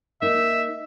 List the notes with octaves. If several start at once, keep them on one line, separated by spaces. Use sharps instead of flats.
A#3 D#4 E5